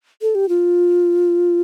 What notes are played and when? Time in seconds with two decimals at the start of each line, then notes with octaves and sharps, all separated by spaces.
0.22 A4
0.35 G4
0.49 F4